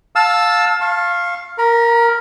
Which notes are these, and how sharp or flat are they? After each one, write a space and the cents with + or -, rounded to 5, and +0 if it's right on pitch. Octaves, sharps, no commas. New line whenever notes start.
F5 +25 A5 +0 E6 +0
F5 +0 C#6 -40
A#4 +0 B5 -45